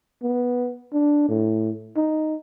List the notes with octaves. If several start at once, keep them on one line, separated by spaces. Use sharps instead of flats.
B3
D4
A2
D#4